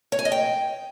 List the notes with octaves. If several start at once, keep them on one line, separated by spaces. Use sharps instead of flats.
C#5
G#5
D#5
G5